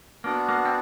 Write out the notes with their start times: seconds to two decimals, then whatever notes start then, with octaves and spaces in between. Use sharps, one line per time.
0.24 A#3 B3 D4 F#4
0.49 A#3
0.65 C4